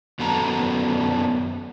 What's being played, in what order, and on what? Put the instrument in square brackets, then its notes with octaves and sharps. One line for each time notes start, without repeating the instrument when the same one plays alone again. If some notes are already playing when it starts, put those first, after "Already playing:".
[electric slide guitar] F#2 B3 A4 A#5